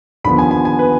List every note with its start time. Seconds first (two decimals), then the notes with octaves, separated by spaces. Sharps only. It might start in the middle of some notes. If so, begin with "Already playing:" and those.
0.24 D#2 D3 F3 B3 B5
0.38 G#5
0.51 G#5
0.65 G#5
0.79 B4